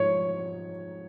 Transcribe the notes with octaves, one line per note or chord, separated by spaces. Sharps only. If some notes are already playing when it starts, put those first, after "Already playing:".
Already playing: G#2 F3 G#3 C#5